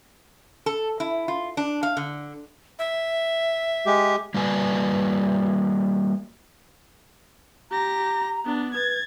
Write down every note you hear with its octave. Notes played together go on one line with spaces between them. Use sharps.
A4
E4
F4
D4
F5
D3
E5
G#3 G4
G3 A#3 F#4 B4 D5 G#5
G4 A#5 A#6
B3 D4
B4 G#6 A6